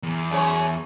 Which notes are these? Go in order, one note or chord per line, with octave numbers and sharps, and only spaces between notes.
E2
F#2 G#4 C#5